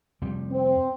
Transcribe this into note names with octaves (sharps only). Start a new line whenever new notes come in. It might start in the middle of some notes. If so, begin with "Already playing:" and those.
F2 C3 G3
C4